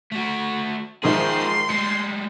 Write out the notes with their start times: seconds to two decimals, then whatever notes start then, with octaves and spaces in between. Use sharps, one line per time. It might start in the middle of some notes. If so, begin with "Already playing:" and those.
0.12 A3 F#4
1.03 G#2 D#3 F3 G#4 E5 C6
1.69 G3 G#3 C#7